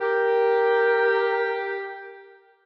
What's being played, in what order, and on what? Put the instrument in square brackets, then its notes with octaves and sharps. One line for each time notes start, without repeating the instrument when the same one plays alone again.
[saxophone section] G4 [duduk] A#4